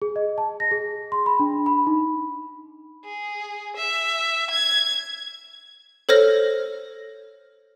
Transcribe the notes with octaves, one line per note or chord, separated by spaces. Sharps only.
G#4
D#5
A5
A#6
G#4
C6
B5
D4
B5
D#4
G#4
E5
G#6
A4 C5 C#5 F6 A#6